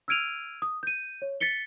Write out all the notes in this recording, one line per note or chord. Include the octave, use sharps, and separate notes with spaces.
E6 F6 G#6 D7 D#7 F7
D#6
G6 D#7
C#5
A6 B6 C#7 G7